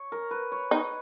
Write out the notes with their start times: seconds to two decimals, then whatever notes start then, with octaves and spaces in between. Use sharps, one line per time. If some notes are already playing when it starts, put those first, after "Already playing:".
Already playing: C#5
0.12 A#4
0.31 B4
0.52 C#5
0.71 D#4